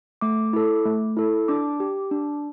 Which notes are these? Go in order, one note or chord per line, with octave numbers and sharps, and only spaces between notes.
A3 D6
E4 A4
A3
E4 A4
D4 D6
G4
D4